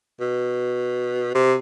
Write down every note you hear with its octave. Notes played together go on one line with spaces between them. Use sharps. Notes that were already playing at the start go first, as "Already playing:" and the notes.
B2
C3